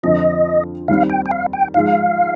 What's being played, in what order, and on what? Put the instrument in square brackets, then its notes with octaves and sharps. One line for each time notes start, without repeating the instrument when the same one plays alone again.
[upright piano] F2 D3 F3 C4 [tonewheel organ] D#5
[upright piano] D#2 D#3 G3 C4 [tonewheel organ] F5
[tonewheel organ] G5
G5
F5
G5
[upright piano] G#2 F3 G#3 [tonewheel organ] F5